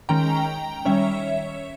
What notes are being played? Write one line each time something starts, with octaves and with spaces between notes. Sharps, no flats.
D#3 G#3 C#4 G5 A#5
D#3 G3 C#4 C#5 E5